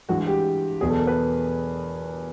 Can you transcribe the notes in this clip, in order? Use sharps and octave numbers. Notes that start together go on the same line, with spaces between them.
G2 E3 G#3 F#4
G4
E2 B2 F#3 G#4
A4
A#4
B4